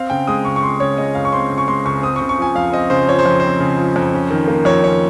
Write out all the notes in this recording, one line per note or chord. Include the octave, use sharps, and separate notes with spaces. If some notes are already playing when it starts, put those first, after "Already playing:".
Already playing: C4 F5
C#3 G5
G#3 D#6
C#2 C#6
C#6
C4 C6
C#3 C#5
G#3 D#5
C#2 F5
C#6
C4 C6
C#3
C#6
G#3 C6
C#2 C#6
C4 D#6
C#6
C#3
C#6
F3 G#5
F2 F5
C4 D#5
C#3 C5
F3 C#5
C5
F2
C4 C5
C#3
F3
F2
C#4
D#3
A#3
F2 C#5
C#4 C#5